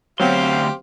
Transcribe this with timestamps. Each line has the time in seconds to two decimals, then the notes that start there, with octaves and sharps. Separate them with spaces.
0.20 D2 F#3 B3 C4 G4 C5 F5 C6